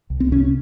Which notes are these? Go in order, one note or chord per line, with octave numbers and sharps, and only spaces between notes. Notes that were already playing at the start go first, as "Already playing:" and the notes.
C2
C4
C3 C#4